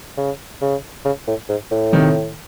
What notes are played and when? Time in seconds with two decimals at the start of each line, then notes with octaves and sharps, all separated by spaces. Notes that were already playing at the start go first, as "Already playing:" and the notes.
0.17 C#3
0.62 C#3
1.05 C#3
1.27 A2
1.49 G#2
1.71 A2
1.93 C3 D#3